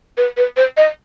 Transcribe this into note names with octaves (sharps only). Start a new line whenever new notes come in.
B4
B4
C5
D#5